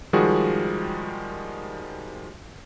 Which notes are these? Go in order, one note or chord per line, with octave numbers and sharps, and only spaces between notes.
D#3 F3 G3 G#3 F#4 G#4